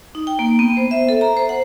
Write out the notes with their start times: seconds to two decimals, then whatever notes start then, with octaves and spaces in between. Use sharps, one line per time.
0.15 D#4
0.27 G5
0.39 A#3
0.59 B3
0.77 C5
0.91 E5
1.09 A4
1.21 A#5
1.37 C5
1.49 F#5